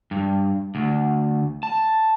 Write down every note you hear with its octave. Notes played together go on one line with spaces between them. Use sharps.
G2
D2
A5